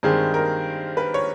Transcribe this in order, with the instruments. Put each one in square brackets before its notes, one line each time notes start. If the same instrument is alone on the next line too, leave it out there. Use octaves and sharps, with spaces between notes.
[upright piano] G2 D#3 G#3 C4 G#4
A#4
B4
C#5